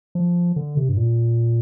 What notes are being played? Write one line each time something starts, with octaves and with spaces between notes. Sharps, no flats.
F3
D3
C3
G2
A#2